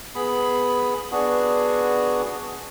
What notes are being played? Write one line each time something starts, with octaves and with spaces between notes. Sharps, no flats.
B3 G#4 B5
B3 D4 F#4 G#4